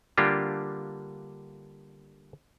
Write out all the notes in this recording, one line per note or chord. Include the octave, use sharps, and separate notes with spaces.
D3 G3 A#3 D4 F4 G4